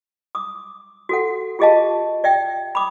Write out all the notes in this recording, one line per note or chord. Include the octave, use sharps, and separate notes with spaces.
D6 D#6
F#4 A4 F#5
F4 G4 G#4 D#5 F5 A5
D5 E5 G5
B5 D6 D#6